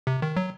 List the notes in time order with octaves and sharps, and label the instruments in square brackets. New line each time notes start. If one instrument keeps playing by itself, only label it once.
[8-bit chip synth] C3
D#3
F#3